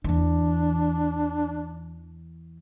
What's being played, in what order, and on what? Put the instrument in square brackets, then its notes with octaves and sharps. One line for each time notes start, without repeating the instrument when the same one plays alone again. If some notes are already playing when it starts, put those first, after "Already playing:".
[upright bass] E2 E3 [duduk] D4